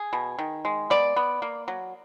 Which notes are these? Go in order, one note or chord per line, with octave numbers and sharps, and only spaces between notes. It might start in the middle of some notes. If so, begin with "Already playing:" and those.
Already playing: G#4
B2
D#3
G#3
B3 D5
B3
A#3
F#3